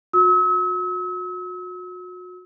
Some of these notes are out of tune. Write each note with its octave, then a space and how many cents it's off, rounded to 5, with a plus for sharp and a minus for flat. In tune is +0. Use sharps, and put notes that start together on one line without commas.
F#4 -35 E6 -45